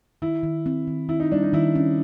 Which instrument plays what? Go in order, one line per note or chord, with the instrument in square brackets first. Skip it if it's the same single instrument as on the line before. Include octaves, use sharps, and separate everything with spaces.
[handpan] D#3 [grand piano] E4
[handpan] D#3
C4
D#3
[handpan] D#3 [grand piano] E4
[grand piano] D#4
[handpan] G3 [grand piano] D4
[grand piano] D#4
[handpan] D#3 [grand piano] E4
[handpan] C#4